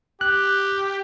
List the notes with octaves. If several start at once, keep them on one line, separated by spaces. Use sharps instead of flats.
G4 F#6